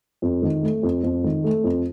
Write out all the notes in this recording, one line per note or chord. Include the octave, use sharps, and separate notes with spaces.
F2
D#3
A3
F2
F2
D#3
A3
F2